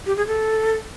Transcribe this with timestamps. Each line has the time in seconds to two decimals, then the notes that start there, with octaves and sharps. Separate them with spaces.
0.06 G4
0.17 G#4
0.27 A4